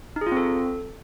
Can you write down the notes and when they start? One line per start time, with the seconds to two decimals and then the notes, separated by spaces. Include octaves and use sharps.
0.16 D#4
0.21 G#4
0.27 F4
0.32 C4
0.37 A4